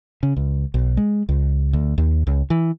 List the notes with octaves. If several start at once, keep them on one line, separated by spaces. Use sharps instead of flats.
C#3
C#2
B1
G#3
C#2
D2
D#2
C#2
E3